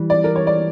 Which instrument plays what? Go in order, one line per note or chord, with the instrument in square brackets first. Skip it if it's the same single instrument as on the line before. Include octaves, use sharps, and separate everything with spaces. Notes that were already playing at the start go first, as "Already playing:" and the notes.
Already playing: [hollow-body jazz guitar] E3 G3
[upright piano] D5
A#4
C#5
D5